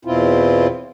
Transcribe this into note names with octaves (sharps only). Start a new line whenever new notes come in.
E2 B2 C4 E4 F4